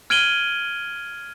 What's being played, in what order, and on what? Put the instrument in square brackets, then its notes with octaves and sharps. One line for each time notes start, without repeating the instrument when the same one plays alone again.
[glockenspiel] F6 G#6 D7 D#7 F#7 G7